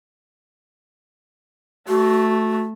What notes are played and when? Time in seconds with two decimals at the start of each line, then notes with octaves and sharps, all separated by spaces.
1.88 A3 F#4